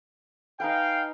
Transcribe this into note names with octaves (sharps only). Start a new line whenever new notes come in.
D#4 B4 F5 G5 G#5